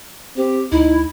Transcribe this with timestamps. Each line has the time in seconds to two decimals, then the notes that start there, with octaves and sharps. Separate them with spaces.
0.37 C4 G4
0.72 D2 D#4 E4